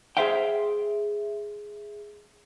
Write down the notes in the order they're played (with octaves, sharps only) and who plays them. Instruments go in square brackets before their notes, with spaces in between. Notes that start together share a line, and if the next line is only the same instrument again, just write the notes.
[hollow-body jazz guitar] G#4 A#4 C5 E5 F5 G5